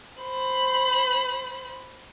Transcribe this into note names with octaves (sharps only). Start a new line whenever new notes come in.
C5 B5